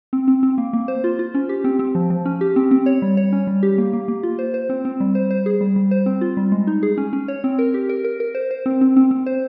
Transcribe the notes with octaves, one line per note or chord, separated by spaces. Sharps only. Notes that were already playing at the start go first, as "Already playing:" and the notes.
C4
C4
C4
A#3
A#3
C5
F4
F4
C#4
G4
C4
C4
F3
F3
C#4
G4
C4
C4
C#5
G3
C#5
C#4
G3
G4
A#3
A#3
A#3
F4
C5
C5
C4
C4
G3
C5
C5
G#4
G3
G3
C5
C4
F4
G3
G#3
D#4
G#4
C#4
C#4
C#5
C4
A#4
G4
A#4
A#4
A#4
C5
C5
C4
C4
C4
C4
C5